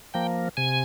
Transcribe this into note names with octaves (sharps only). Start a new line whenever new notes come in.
F3 A#3 G5
C3 G#5